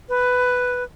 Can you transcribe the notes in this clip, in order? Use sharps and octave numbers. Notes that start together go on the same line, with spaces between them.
B4